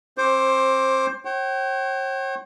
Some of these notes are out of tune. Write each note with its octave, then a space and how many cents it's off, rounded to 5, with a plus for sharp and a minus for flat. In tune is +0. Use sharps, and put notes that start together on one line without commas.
C4 +30 C5 +15 D6 -10
C#5 -45 G5 -40